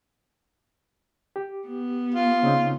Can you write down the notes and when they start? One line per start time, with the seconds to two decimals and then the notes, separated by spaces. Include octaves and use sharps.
1.36 G4
1.67 B3
2.14 F4
2.43 C#3 C4 D#4